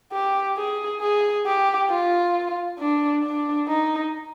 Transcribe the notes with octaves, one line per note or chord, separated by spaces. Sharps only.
G4
G#4
G#4
G4
F4
D4
D4
D#4